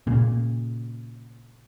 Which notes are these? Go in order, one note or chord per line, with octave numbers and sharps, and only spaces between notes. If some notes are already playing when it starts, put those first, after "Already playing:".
A#2 C#3